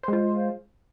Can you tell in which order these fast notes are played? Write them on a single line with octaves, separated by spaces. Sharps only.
C5 G#3 F4